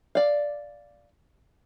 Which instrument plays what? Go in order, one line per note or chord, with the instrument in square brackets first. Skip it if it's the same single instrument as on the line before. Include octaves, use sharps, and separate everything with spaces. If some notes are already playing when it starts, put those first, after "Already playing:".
[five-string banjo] D5 F5